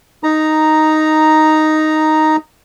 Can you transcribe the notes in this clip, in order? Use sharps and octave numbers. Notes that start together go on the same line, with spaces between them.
D#4 A#5